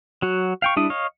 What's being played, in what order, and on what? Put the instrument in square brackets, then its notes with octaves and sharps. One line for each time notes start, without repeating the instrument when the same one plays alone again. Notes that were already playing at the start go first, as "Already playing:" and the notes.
[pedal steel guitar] F#3 F#4
F5 G5 C#6
G3 D4 E4 D#6
C#5 D#5 F5